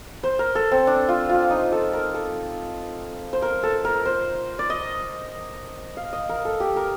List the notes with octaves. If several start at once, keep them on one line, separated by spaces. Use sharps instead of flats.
C5
A#4
A4
C4
D4
F4
F4
D#4
A4
A#4
A4
C5
A#4
A4
A#4
C5
D5
D#5
F5
D#5
A#4
A4
G4
A#4